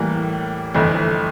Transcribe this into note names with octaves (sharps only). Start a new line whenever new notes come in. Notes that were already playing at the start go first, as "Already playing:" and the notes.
Already playing: A2 E3 G3 A#3
G1 F2 E3 A3